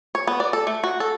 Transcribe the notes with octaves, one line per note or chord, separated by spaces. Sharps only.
C#5
B3
D5
A4
A3
F#4
A4